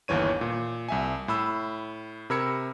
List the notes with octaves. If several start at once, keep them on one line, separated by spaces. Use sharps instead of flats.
G1 D#2 E3 C#5 D#7
A#2
C2 E5 G#5
A2 B5 E6
C3 A#4 B5 E6 G#6 C#7